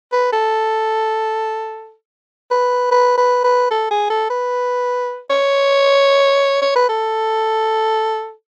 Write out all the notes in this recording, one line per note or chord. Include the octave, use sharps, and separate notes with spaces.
B4
A4
B4
B4
B4
B4
A4
G#4
A4
B4
C#5
C#5
B4
A4